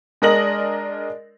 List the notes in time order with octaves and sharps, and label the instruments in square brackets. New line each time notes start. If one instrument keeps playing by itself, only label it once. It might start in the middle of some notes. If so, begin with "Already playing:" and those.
[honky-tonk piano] G#3 D4 A#4 D#5 A#6 F#7